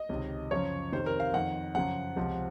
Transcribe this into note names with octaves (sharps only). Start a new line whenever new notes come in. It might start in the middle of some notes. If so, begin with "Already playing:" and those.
Already playing: D#5
C#2 C3 D#3
F#2 C#3 F3 C#5
F2 C3 D#3 C5
A#4
F5
F2 D#3 F#5
F#2 C#3 F3 F#5
C#2 C3 F3